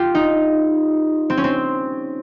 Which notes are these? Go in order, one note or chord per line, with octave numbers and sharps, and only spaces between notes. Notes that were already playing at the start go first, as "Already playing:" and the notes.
Already playing: F4 G4
D#4
C4
C#4
C4